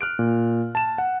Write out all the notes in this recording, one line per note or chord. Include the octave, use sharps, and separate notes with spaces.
F6 F#6 D7
A#2
A5 E7
F#5